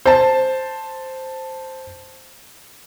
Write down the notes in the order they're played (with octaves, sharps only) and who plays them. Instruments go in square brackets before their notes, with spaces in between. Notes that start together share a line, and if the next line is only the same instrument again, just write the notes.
[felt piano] C5 A5